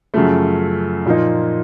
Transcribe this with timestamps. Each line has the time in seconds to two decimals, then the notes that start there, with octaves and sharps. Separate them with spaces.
0.14 F#2 C#3 F3 A3
1.06 A#2 F3 A#3 D#4